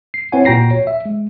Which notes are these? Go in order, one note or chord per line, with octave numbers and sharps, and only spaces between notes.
C7
C4 E4 B4 C#5 F#5 G#5
A#2 F#4 G5 A#5 A#6 C7
C#5
E5
G#3